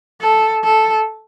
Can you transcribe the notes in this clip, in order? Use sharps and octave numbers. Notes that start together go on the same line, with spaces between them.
A4
A4